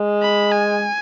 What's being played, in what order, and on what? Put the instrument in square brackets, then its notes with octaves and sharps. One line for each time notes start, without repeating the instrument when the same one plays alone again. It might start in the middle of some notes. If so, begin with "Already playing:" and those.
Already playing: [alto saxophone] G#3
[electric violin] B5
G#5